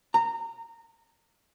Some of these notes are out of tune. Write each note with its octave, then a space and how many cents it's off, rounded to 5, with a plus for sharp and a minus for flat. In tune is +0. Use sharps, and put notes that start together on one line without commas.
A#5 -20